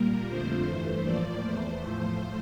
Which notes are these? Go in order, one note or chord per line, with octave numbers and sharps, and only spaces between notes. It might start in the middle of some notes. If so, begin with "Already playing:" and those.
Already playing: A#2 G3 A#3 A#4
F2 D3 F3 A3 C5
G2 E3 A3
A2 F3 A#3 D5
E2 E3 A3 C5
A2 F3 A3 C5